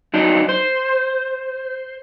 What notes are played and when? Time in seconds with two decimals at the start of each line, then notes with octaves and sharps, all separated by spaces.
0.14 F#3 D4 D#4
0.49 C5